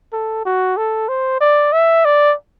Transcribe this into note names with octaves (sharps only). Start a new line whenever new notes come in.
A4
F#4
A4
C5
D5
E5
D5